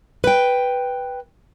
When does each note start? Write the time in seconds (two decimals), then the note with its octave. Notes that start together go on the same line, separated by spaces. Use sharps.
0.24 B4 G5